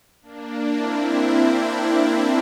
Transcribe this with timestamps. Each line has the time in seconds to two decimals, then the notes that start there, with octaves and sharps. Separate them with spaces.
0.22 A#3 D4
0.73 C4 E4